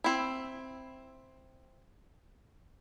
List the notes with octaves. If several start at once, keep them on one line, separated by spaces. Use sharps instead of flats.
C4 E4